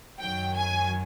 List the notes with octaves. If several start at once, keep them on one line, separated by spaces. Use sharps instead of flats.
F#2 D#3 F#3 G5
G#5